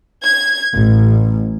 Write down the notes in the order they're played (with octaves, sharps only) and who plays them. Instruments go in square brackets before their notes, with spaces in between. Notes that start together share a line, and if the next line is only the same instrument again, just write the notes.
[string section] G#6
A1